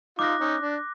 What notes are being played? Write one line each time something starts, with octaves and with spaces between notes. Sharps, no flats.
D#4 F4 D6 F#6 A#6
C#4 D#4
D4